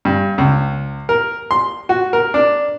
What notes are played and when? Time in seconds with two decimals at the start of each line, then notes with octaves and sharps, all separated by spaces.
0.05 G2
0.38 C#2
1.09 A#4
1.51 C6
1.89 F#4
2.13 A#4
2.34 D4